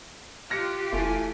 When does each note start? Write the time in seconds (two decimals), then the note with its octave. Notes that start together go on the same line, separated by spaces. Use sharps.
0.50 F4 G4 F6 F#6 A#6 C#7
0.93 F1 E3 A3 G#5